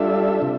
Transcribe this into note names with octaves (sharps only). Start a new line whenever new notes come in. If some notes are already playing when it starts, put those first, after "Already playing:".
Already playing: G3 D4 F4 A4 E5
C3